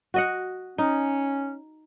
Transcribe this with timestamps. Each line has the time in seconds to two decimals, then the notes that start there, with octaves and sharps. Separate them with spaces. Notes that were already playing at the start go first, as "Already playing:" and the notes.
0.14 F#4 D#5 F#5
0.78 C#4 D#4